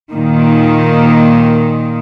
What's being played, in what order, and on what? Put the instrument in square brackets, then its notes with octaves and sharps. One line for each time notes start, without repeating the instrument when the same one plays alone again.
[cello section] A#2 D#3